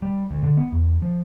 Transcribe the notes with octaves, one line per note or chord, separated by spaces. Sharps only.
G3
D2
D3
B3
E2
F3